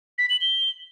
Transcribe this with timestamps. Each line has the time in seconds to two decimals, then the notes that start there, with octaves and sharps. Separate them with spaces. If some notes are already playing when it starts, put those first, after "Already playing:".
0.18 B6
0.30 F#7
0.41 G7